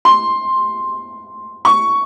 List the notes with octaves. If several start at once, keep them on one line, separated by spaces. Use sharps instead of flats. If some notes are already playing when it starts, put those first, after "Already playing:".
C6
C#6